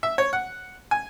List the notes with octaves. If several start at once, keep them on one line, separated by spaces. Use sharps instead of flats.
E5
C#5
F#5
G#5